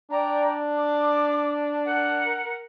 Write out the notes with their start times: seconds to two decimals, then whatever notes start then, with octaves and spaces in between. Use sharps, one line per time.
0.10 D4 D5 G5 A#5
0.77 D6
1.85 A#4 F#5